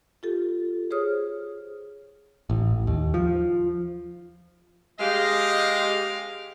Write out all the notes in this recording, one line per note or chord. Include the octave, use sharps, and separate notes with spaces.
F4 G4 A4
G#4 C5 C#5 D#6 F6
A1
D#2
F3
G#3 G4 D#5 F5